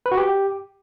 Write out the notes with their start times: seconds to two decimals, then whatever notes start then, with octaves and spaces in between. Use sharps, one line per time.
0.06 B4
0.12 F#4
0.17 G4